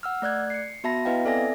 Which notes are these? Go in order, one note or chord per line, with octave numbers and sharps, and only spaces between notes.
F#5 E6 F6
A3 D5 F#6 G#6
C7 C#7
B3 F#4 E5 A5 B5 A#6
B3 E4 B4 D#5 F5 G5
C4 A4 D5 E5 G#5 A#6